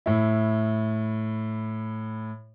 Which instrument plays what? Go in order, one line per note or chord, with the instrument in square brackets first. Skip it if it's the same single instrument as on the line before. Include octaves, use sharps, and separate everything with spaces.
[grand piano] A2 E4